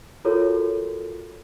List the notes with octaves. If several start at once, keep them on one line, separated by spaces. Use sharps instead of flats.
F4 F#4 A4 A#4 C#5